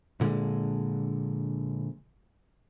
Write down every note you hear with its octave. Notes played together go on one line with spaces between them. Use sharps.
A#1 A#2 D3 G#3